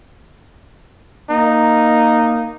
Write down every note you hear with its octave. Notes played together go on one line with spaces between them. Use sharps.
A#3 D#4